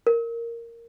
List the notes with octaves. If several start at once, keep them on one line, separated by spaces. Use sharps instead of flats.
A#4